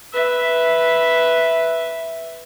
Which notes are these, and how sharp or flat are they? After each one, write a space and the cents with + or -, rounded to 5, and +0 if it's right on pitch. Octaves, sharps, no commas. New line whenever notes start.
B4 +0 E5 +0